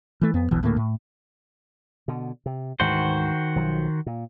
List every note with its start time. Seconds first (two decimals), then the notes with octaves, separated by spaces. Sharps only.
0.21 E3 A3
0.34 F2 B3
0.51 E1 B1 B2 E3
0.63 D2 A2 A3 A#3
0.77 A2
2.08 B2 D3
2.46 C3
2.80 D2 G#2 D#3 E3 F#4 C5
3.56 B1 F3 F#3
4.06 A#2